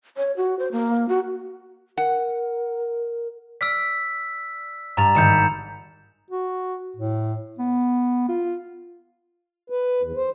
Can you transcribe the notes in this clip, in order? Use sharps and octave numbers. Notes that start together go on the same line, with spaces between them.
C#5
F#4
C5
A#3
F#4
A#4 F#5
D5 E6 F6 B6
G2 A#5 A6 F7
G#1 D#3 E5 G6 C#7 E7
F#4
A2
B3
F4
B4
E2
C5